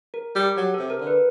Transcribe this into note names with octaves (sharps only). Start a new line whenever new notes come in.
A#4
G3 G4
F#3 G4
A4
C3
A#4
D3
B4